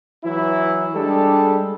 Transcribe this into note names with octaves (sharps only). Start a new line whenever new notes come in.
E3 F#3 E4
G3 G#3 D4 G4 A4